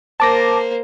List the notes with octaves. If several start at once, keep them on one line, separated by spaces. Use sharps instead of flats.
A#3 C5 A5 D6 A#6